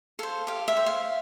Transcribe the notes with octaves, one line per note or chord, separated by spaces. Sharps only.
A4 C5 F5
G4 F5
E5
C5
F5